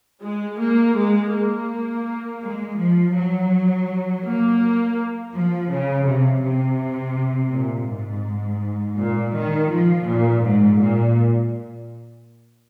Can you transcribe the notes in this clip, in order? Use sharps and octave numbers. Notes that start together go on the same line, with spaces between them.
G#3
A#3
G#3
A#3
G#3
F3
F#3
A#3
F3
C#3
C3
C3
A#2
G#2
A#2
D#3
F3
A#2
G#2
A#2